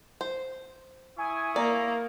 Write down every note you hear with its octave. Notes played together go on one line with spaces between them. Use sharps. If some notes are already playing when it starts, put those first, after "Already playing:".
C5
E4 G#5 C#6 D#6
A#3 D5 A#5